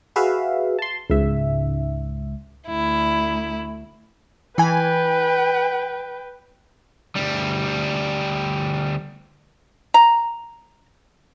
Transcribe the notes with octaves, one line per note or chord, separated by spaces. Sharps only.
F#4 G#4 B4 E5 F5
A5 C6
C#2 G#2 E5
D2 E4
E3 B4 G5 G#5
D2 G3
A#5